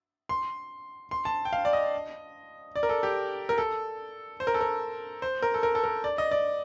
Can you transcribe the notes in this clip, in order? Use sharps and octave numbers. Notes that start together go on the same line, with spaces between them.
C6
C6
A5
G5
F5
D5
D#5
D5
A#4
A4
G4
A#4
A4
C5
A#4
A4
A#4
C5
A#4
A4
A#4
A4
A#4
D5
D#5
D5